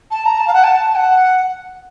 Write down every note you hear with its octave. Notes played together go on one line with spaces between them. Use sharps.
A5
A#5
A5
F5
F#5
A5
A5
A5
F#5